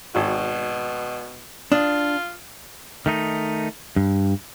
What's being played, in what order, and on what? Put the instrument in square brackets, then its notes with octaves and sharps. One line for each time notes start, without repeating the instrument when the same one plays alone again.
[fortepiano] G#1 F#4 [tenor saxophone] B2
[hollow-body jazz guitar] D4 [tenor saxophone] F4 [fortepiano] D#6
[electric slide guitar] D#3 A3 D#4
G2